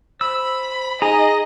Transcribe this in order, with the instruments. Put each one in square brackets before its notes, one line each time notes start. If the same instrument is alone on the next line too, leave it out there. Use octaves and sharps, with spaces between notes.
[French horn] C5 [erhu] B5 [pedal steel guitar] E6
[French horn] D#4 [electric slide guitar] G#4 [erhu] D#5 [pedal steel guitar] A#5